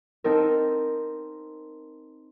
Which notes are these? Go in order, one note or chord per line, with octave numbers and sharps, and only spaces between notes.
C4 D#4 A4 A#4